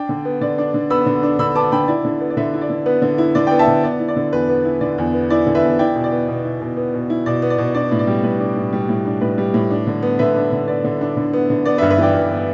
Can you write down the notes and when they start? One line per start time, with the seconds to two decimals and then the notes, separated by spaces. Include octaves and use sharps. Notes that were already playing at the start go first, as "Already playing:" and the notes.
Already playing: D4 D5 G5
0.09 D3
0.25 B3
0.41 D3 D5
0.58 D4
0.74 D3
0.90 B3 B5 E6
1.06 D3
1.23 D4
1.39 D3 B5 E6
1.55 B3 A5 D6
1.72 D3 G5 B5
1.88 E4 D5
2.05 D3
2.21 B3
2.30 D5
2.37 D3 B4 E5
2.54 E4
2.61 D5
2.70 D3
2.86 B3 B4
3.02 D3
3.18 E4
3.35 D3 D5
3.47 B3 D5 G5
3.59 E5 A5
3.67 D3
3.84 B3 D5
4.00 E4
4.08 D5
4.16 D3
4.33 E2 B4
4.49 B3
4.65 E4
4.81 D3 D5
4.98 E2
5.14 B3
5.30 E4 D5
5.46 D3
5.55 B4 E5
5.63 E2
5.79 E4 D5 G5
5.96 B2
6.04 D5
6.12 B3
6.28 B2
6.44 E4
6.61 B2
6.77 B3
6.94 B2
7.10 E4
7.26 B2 D5
7.42 B3
7.50 D5
7.58 B2
7.74 D4 D5
7.91 A2
7.99 D5
8.07 G3
8.24 A2 B4
8.40 D4
8.56 A2
8.73 G3
8.89 A2
9.06 D4
9.21 A2 B4
9.38 G3
9.54 A2
9.70 D4
9.87 D3
10.03 B3
10.19 D3 B4 E5
10.35 D4
10.52 D3
10.68 B3 D5
10.84 D3
11.01 D4
11.17 D3
11.33 B3
11.50 D3
11.66 B3 D5
11.78 B4 E5
11.82 G2
11.90 B4 E5
11.98 E3 D5 G5
12.15 G2
12.31 B3